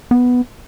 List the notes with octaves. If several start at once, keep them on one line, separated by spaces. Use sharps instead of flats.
B3